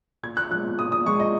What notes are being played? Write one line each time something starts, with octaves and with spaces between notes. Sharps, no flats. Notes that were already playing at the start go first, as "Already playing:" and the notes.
A#2 G#6
F#6
F3 G#3 F#6
A#2 D#6
D#6
F3 G#3 C#6
D#5